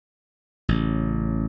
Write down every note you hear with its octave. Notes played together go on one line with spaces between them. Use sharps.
A1 C#3